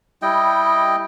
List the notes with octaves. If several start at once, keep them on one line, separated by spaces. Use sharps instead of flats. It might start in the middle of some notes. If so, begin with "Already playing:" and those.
G3 E4 D#5 G5